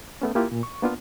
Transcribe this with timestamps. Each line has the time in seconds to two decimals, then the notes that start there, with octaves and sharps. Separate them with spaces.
0.22 A3 B3 C#4
0.35 A#3 E4 F4 G4
0.52 A#2
0.63 C#6
0.82 A#3 B3 D4 F4